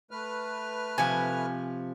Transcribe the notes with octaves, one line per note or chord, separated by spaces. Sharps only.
A3 B4 F6
C3 F3 G#5